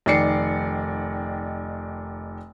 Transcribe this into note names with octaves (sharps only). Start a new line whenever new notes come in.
F1 D#3 D5 C7 C#7